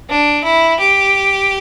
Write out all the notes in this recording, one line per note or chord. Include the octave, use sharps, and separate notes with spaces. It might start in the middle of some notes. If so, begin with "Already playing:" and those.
D4
E4
G4